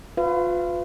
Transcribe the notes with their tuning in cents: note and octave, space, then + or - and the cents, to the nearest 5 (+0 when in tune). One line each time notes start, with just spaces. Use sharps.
F4 +30 B4 +30 F5 -40